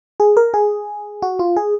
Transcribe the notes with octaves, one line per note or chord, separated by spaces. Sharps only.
G#4
A#4
G#4
F#4
F4
G#4